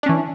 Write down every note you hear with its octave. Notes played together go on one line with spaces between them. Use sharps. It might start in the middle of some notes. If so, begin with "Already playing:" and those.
E3 C#4 D4